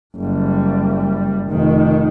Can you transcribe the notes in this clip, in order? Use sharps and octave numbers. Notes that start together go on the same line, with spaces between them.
F#1 G3
F1 D#3